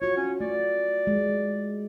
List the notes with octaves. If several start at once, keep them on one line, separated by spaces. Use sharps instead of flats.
F4 F#4 C#5
C#4
A3 D5
G#3